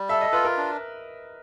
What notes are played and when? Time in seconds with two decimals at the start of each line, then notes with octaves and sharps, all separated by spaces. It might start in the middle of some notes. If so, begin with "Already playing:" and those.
Already playing: G3
0.09 A4 E5
0.21 D#5
0.33 F4 B4
0.45 A#4
0.57 D4